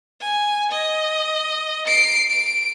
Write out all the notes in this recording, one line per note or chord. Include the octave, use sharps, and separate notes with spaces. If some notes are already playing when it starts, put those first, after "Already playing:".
G#5
D#5
C7 D7
D7